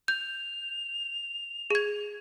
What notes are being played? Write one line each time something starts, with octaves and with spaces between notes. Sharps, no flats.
G6 F7
G#4 G#6